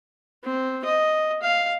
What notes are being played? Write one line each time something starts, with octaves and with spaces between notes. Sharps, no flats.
C4
D#5
F5